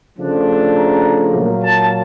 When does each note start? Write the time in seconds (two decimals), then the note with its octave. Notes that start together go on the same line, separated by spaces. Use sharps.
0.18 C#3 F3 A3 D4
0.75 A#5
1.33 A#2 F#3 A#3
1.62 A5